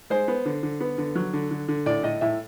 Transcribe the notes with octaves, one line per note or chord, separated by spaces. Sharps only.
G#3 C5
B3
D3
D3
B3
D3
F#3
D3
D3
D3
A2 D5
A2 D#5
A2 E5